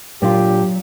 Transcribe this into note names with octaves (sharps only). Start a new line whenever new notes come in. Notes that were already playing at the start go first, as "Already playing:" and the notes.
A#2 F#3 D4 F4 G4